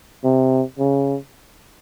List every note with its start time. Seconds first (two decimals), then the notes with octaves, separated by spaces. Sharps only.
0.24 C3
0.79 C#3